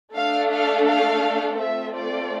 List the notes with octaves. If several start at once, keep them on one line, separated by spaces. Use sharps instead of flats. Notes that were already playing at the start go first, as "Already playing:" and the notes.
A3 D4 A4 F5
F5
F5
A3 C4 F4 A4 E5
D5